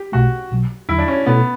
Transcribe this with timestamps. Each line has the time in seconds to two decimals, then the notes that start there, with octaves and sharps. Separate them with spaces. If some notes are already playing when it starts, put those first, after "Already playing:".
Already playing: G4
0.12 B1 B2 A3 F#4
0.51 B1 B2 F#3
0.89 E2 D3 F#3 E4
0.98 D4
1.08 C#4
1.26 B2 A3 B3 E4 A4